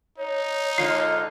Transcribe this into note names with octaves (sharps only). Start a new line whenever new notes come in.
D#4 C#5
G#2 D3 F4 C7